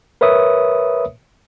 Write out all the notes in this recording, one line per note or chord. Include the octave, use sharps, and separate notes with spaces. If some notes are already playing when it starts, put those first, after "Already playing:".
A#4 B4 C#5 E5 D#6